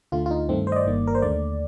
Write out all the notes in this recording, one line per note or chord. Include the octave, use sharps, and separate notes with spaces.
D2 D3 A3 F4
F4
D#4
G2 D#3 A3 C4
C5
D#5
D5
G1 G2 D#3 A#3
A#4
C5
D#2 D3 A3 D5